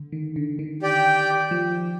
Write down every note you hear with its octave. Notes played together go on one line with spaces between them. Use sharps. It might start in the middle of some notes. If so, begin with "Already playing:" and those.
Already playing: D3
D#3
D3
D#3
G4 D5 G5
F3